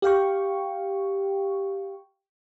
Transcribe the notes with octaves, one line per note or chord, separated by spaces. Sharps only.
G4 F5 G5 C#6